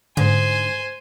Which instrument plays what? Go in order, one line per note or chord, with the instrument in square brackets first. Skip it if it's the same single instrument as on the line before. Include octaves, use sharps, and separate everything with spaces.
[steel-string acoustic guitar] G#2 [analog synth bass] D3 [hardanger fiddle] C5 G#5